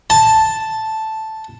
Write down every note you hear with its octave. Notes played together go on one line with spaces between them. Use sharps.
A5